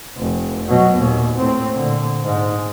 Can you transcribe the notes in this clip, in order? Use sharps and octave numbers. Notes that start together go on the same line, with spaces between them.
F1
B2 F#3
D#2 A#2
A2 C4
A#2 D3
G#2